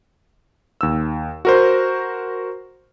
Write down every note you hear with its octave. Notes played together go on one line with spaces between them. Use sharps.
D#2 E6
F#4 A#4 C5